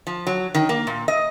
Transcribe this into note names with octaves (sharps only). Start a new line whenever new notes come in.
F3
F#3
D#3
A#3
A#2
D#5